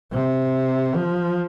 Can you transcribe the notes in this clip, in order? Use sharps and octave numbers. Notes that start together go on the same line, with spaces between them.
C3
F3